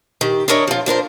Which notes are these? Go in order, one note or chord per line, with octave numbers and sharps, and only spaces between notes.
D#3 G4
D4 E4 A#4 C#5 D#5
F3 F4
F3 D4 A#4 C5